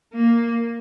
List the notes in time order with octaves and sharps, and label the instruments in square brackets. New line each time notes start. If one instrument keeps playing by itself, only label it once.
[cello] A#3